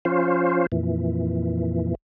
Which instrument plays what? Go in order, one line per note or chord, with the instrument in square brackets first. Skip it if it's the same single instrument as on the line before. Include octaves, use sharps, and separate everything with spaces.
[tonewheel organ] F3 C#4 F4 C5
F2 A#2 E3